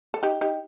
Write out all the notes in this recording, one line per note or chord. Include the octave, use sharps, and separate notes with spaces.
A4
D#4 G4
D#4 G4